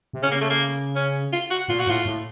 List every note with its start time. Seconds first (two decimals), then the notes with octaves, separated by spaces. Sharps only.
0.13 C3
0.22 C#3 C#4
0.31 A#3
0.41 A3
0.50 A#3
0.96 C#4
1.33 F4
1.51 F#4
1.68 A#2 F4
1.79 F#4
1.87 A2 F4
2.05 A2